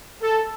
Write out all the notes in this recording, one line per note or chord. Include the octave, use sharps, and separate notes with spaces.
A4